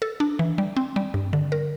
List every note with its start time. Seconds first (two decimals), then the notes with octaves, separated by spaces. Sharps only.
0.02 A4
0.20 D4
0.39 E3
0.58 G3
0.77 C4
0.96 G3
1.14 G2
1.33 D3
1.52 A#4